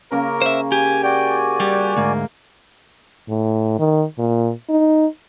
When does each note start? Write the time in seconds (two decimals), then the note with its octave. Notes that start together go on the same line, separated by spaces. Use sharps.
0.12 C#3 A#3 A#4
0.42 C5 E5
0.72 G4 G#5
1.04 F#4 D5 G5 G#5
1.60 G3 G4
1.97 D2 G#2 A#3
3.29 A2
3.79 D#3
4.19 A#2
4.69 D#4